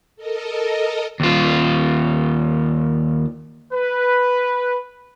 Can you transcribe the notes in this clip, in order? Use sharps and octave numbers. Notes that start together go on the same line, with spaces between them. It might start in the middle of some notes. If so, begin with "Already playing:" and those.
A4 A#4 D#5
D#2 F4
B4